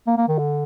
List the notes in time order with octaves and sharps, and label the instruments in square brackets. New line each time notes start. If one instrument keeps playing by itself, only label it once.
[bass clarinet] A#3
A#3
D#3
D3